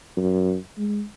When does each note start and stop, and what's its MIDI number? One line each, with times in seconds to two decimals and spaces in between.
0.17 0.57 42
0.78 1.03 56